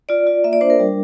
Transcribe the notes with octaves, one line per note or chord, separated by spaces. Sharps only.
F4 D5
F4
A#3 E5
D5
D4 C5
A#4
G3